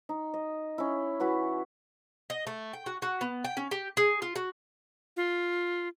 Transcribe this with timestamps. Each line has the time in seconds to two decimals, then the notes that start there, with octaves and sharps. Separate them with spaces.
0.09 D#4
0.34 D#5
0.78 C#4 E4
1.20 E3 E4 F#4 B4
2.30 D#5
2.47 A3
2.73 G5
2.86 F#4
3.02 F#4
3.21 B3
3.45 G5
3.57 C#4
3.71 G4
3.97 G#4
4.22 F4
4.36 F#4
5.17 F4